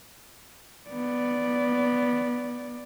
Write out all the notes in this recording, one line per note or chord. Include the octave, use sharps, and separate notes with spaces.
B3 D5